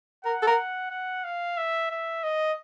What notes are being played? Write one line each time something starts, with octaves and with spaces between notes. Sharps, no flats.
A#4 F#5
A4
A#4
F#5
F5
E5
E5
D#5